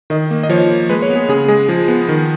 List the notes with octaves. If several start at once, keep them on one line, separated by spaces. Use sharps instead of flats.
D#3 D#5
A#3
D#5
F3 C#5
A#3
G#3 B4
C#5
B3
G#4
C#3 G#4
G#3 G#4
F3 G#4
B3
D#3